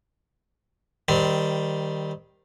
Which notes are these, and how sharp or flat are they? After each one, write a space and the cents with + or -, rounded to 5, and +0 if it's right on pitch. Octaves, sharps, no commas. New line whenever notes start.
D#3 +0 G3 +0 C4 -25